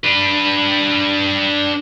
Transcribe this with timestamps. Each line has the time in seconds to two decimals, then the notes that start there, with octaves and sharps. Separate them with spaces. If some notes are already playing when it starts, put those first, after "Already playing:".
0.04 D4 B4